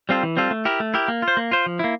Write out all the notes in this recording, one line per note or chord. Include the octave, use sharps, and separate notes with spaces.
G3 C4 F4 A4
E3
G3 C4 F4 A4
A3
E4 G4 A#4
A3
E4 G4 A#4
A#3
F4
C5
A#3
F4 C5
F3
A#3 E4